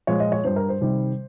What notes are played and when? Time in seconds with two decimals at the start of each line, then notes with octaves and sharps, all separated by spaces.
0.07 A#2 F3 G#3 C#5
0.20 D#5
0.32 C#5
0.44 G2 G3 C5
0.56 A#4
0.69 C5
0.81 C3 D#3 G3